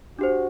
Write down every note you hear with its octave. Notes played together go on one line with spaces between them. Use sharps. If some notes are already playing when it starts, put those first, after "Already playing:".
D4 F#4 G4 C5